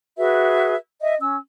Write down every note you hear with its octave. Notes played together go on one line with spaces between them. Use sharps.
F#4 G#4 B4 E5
D#5 E5
C#4 E6